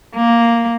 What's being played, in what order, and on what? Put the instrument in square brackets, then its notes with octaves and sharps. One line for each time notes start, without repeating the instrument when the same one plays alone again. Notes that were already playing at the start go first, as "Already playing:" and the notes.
[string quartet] A#3